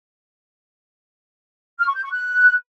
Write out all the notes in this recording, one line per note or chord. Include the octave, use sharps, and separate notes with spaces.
F6
C#6
G6
C#6
F#6